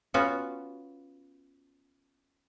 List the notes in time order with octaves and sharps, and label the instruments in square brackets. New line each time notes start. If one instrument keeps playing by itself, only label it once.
[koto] B3 C#4 F4 F#4